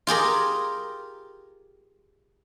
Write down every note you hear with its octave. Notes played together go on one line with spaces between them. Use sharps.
F4 G4 G#4 A#4